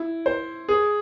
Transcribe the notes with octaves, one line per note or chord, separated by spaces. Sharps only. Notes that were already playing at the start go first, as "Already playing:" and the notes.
Already playing: E4
C5
G#4